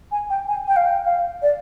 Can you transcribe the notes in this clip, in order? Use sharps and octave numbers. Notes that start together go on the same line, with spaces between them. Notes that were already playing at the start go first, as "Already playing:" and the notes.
G#5
G5
G#5
G5
F5
G5
F5
D5